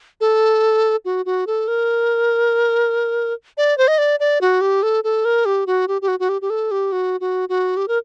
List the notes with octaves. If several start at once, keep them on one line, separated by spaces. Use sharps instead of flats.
A4
F#4
F#4
A4
A#4
D5
C5
D#5
D5
D5
F#4
G4
A4
A4
A#4
G4
F#4
G4
G4
F#4
F#4
G4
G4
A4
G4
F#4
F#4
F#4
G4
A#4